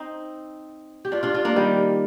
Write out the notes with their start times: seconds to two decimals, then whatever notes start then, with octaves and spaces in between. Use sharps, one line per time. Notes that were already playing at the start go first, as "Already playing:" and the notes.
Already playing: C4 D#4
1.05 G4
1.12 D4 F4
1.23 D4 F4
1.34 D4 F4
1.45 A#3 D4
1.56 D#3 G3